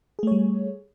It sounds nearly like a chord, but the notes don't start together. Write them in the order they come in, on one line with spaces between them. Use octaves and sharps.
G#4 A3 C#5 G3